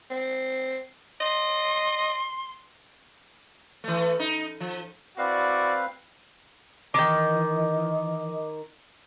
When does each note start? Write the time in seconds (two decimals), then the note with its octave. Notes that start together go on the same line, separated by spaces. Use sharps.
0.10 C4
1.20 D#5 C6
3.84 E3 A3
4.20 D#4
4.60 F3
5.18 C4 E4 F#4 B4 D5 F5
6.94 D#3 E3 D#5 G5 D6